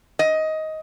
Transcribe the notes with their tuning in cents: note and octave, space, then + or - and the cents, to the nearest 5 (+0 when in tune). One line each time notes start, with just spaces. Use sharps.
D#5 +15